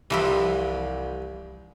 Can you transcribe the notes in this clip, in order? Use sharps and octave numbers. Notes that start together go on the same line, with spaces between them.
C2 G2 C3 E3 F3 E4